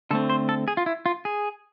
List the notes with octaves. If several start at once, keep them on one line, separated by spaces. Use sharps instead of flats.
D3 A3 C4 A4
C5
A4
G#4
F4
E4
F4
G#4